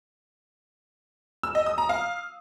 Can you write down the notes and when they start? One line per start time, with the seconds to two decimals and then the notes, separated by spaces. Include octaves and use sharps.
1.43 E6
1.55 D#5
1.66 D#6
1.78 A#5
1.89 F5